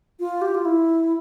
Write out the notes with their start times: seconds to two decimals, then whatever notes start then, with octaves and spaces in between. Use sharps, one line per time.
0.20 F4
0.42 G4
0.54 F4
0.65 E4